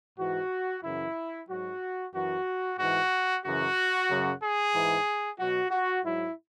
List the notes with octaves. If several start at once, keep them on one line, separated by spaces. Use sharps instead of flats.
G#2 E3 F#4
F#2 C#3 E3 E4
G#2 F#3 F#4
F#2 E3 F#4
G#2 E3 F#4
F#2 C#3 E3 F#4
F#2 C#3 F#3
G#4
G#2 E3
B2 F#3 F#4
F#4
G#2 F#3 E4